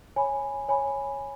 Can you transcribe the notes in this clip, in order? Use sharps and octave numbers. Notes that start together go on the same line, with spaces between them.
C#5 G#5 B5
C#5 G#5 B5